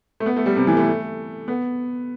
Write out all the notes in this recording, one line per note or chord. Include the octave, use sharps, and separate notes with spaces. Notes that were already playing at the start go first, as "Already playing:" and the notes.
A3
B3
A3
G3
C3
E3
A3
B3